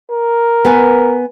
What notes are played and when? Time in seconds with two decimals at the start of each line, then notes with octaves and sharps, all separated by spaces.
0.11 A#4
0.65 B3 B4 G#5